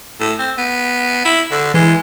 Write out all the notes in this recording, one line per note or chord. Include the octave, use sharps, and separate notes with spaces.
A2
C4
B3
E4
D3
E3 G#3